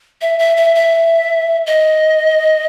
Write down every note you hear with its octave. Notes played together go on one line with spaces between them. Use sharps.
E5
E5
E5
E5
D#5